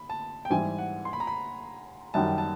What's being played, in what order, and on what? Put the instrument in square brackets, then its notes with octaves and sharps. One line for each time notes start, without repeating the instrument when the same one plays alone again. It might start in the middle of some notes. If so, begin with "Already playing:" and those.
Already playing: [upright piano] B5
A5
G5
[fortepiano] G#2 E3 G3 [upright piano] G#5
[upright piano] F#5
C6
B5
A#5
B5
[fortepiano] F#2 D#3 G3 [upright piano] A5
[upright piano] A5